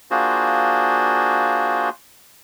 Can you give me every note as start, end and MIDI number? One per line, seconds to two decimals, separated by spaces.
0.11 1.89 58
0.11 1.89 62
0.11 1.89 65
0.11 1.89 66
0.11 1.89 68
0.11 1.89 72